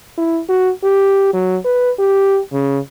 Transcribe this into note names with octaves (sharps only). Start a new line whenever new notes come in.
E4
F#4
G4
F#3
B4
G4
C#3